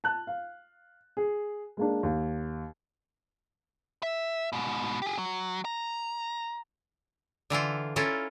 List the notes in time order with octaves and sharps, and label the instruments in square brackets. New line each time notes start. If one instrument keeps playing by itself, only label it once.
[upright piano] A5 F#6
F5
G#4
G#3 A#3 D4
D#2
[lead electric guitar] E5
G#2 B2
G4 G#4
F#3
A#5
[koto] D3 E3 E4 F4
C#4 E4 F4 A4 A#4